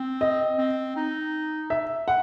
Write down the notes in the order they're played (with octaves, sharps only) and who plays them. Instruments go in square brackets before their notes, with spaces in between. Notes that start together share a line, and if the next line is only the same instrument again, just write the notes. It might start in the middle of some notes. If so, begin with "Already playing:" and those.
Already playing: [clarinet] C4
[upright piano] D#5
[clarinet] C4
D#4
[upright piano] E5
F#5